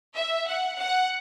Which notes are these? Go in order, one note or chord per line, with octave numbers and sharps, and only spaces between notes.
E5
F#5
F#5